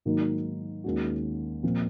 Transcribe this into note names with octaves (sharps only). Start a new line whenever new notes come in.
G#2 D#3 F#3 A#3 D#4
D#2 D#3 G#3 C#4 F#4
A#2 F3 C4